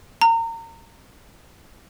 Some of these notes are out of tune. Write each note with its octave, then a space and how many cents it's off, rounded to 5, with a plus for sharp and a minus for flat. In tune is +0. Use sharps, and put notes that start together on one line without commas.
A#5 -30